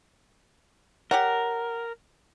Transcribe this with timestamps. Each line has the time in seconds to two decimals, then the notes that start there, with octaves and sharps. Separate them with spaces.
1.11 G4 A#4 C#5 F#5